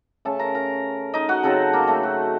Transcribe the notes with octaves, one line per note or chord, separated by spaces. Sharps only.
C#3 A3 C#4 A4 A5
A#4 A#5
A#4 A#5
D#4 D#5
F#4 F#5
C#3 F#3 C4 D#4 A4 A5
A#3 A#4
A3 A4
F#4